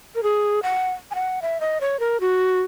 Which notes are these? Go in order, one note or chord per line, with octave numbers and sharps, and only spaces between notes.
A#4
G#4
F#5
G#5
F#5
E5
D#5
C#5
A#4
F#4